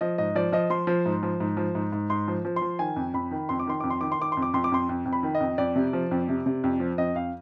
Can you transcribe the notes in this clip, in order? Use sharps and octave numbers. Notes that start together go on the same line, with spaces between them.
F3 D#5
G#2 D#5
F3 D5
F3 D#5
F3 C6
F3
G#2
F3
G#2
F3
G#2
G#2
G#2 C6
F3
F3
C6
F3
D#3 G#5
F2
F2 B5
D#3
F2 C6
D6
D#3 C6
F2 D6
C6
D#3 D6
C6
D#3 D6
F2 C6
D6
F2 C6
D6
F2 C6
F2
F2
B5
D#3
D#5
F2
F2 D5
C3
F3
F2
C3
C3
F2
F3
F2 D#5
F2 F5